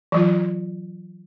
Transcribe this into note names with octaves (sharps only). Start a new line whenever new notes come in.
E3 F#3 F4